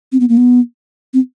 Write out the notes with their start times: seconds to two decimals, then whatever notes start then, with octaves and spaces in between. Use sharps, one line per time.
0.12 C4
0.20 B3
0.29 A#3
0.37 B3
1.14 C4